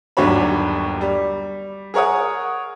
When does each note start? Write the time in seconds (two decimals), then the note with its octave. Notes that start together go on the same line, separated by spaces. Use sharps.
0.17 G1 D#2 F#3 D4 C#5 B5
1.01 G3
1.94 G#4 A#4 C#5 F#5 D#6